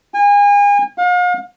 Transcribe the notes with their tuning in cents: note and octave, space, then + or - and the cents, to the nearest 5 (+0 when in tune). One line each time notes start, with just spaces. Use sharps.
G#5 -35
F5 +40